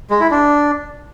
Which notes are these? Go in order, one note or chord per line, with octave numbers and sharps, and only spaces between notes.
G#3
E4
D4